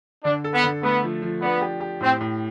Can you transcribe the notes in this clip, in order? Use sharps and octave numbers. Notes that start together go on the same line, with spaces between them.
D3 D4
A4
B3
D3
A3 B3
F3
F3
B3 D4
G4
G4
A2 C4
A2